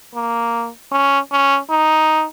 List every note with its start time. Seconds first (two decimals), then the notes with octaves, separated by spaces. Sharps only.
0.15 A#3
0.92 C#4
1.32 C#4
1.70 D#4